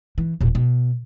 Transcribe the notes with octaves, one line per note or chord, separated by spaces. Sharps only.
E3
E1 A#2
B2